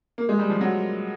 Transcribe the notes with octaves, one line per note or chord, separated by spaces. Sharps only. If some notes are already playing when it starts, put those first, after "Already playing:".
A#3
G#3
G3
F3
F#3